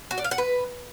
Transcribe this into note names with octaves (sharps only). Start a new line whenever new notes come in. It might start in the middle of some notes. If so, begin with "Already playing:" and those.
F#4
D5
F5
F#5
B4